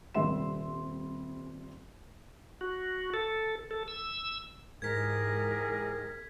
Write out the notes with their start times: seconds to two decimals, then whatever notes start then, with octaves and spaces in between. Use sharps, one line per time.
0.14 D#1 C3 G3 E5 C6 E7
2.61 F#4
3.14 A4
3.71 A4
3.88 E6
4.82 G#2 E3 G4 G#4 A#4 G#6 B6